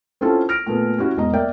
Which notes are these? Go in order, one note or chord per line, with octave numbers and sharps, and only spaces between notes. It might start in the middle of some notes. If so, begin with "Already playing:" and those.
C4 C#4 E4 F4 A4
F6 A#6 D7
A#2 A3 B3
C#4 E4 F#4
E1 G#2 D#5 A#5
A#3 D5 E5 G5